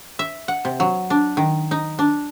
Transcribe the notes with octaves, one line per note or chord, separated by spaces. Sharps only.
E5
F#5
C3
F#3
D4
D#3
D#4
D4